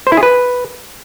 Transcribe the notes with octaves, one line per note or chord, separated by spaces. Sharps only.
C5
E4
G#4
B4